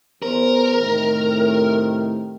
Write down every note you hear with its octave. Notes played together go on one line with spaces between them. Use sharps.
E2 A#4 C5
A2 C3 D#3